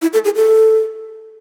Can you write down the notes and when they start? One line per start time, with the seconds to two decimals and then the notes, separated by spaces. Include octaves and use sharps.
0.02 E4
0.13 A4
0.25 G#4
0.36 A4